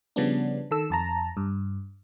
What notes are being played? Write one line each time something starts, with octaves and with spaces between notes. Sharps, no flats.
C#3 F3 G3 B3 C#4 D4
D#3 A4 E6
F2 A5 A#5
G2